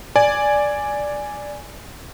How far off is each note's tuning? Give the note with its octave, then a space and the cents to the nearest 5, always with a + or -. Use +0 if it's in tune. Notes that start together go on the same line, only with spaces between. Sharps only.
D5 +0 G#5 +0